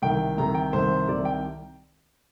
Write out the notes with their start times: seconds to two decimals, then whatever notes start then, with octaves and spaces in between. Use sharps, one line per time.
0.02 C2 C3 D#3 G5
0.37 C2 C3 D#3 A#5
0.55 G5
0.73 C2 C3 D#3 C5
1.08 C2 C3 D#3 D5
1.25 G5